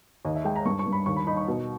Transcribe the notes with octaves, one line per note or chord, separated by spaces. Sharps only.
D#2 D#5
E5
G#3 G5
A#5
G2 C#6
C#6
G2
B5
D#2 C#6
B5
D#4 B5
C#6
B2